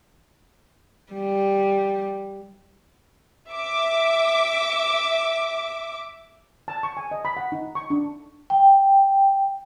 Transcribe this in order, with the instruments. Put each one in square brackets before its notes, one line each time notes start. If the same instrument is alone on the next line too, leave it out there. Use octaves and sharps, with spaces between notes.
[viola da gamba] G3
[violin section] E5 D6
[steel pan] A5
C#6
G#5
D#5
B5
F#5
D#4
C#6
D4
[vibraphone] G5